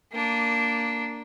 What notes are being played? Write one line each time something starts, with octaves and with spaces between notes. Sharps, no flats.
A#3 D4